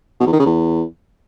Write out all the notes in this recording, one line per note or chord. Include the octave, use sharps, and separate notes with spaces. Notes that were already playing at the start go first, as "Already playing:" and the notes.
B2
E2
D#3
C#3
E2